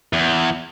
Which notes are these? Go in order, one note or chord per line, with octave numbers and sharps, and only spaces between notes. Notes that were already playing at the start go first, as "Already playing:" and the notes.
E2